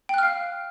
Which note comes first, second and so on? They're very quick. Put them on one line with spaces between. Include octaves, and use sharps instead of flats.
G5 F#6 F6 F5